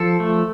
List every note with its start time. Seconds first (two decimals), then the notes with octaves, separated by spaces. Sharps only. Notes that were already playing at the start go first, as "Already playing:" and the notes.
Already playing: F3 A4
0.20 A3